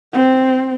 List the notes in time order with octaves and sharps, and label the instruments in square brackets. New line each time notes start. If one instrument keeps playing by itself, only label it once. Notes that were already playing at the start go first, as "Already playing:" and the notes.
[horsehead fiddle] C4